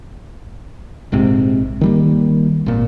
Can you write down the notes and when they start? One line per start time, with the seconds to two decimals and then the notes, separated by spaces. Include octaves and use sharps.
1.12 A#1 G#2 C3
1.81 D#3 G3 A#3
2.66 G#1 A#2